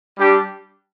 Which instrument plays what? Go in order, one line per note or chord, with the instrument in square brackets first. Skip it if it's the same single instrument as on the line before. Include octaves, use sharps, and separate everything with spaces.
[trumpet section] G3 D4 G4